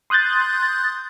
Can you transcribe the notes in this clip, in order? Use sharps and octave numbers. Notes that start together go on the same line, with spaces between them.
C6 D#6 F#6 G6 A6